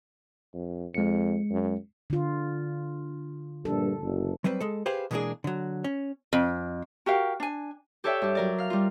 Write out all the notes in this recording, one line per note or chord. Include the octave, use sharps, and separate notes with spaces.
F2
F2 G#3 C#7
F#2
D3 F4
A#1 G2 A4
F#1
F#3 G3 C4 B4
G#3 A4
G4 G#4 B4 C5 F5
B2 E3 G#3 A#3 D4 G#4
D3 F#3
C#4
F2
F#4 G4 A#4 F5
D4 G#5
G4 A4 C#5 D5 E5 G5
G2 G4
F#3 A#4 D5
F5 F6
G3 F4